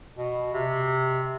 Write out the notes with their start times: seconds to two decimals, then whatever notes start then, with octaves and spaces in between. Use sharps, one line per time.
0.16 B2
0.54 C3